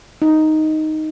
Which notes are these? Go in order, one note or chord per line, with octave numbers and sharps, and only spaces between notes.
D#4